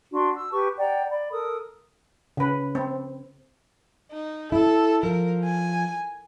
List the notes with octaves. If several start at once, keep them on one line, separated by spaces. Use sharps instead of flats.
D4 F#4 C6
E6
G4 B4 A5 C#6
D5 F#5 G5 A#5
D5 B5
A4 A#4 D#6
C#3 B4
C4
D#4
E4 A4
F3 A#4
G#5